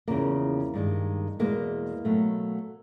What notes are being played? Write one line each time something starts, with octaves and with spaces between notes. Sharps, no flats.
E2 C#3 F3 A#3
G2 D#3 G#3
E2 B2 G#3 A#3
B2 F#3 A3